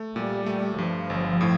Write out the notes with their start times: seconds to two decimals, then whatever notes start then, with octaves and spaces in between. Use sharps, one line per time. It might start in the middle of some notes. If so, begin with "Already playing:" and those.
Already playing: A3
0.15 A#2 G3
0.46 A3
0.78 G2 F3
1.10 G1
1.41 A2